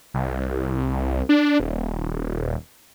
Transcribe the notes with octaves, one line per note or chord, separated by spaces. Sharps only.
C2
D4
D#1